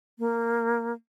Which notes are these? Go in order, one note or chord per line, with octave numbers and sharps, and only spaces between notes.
A#3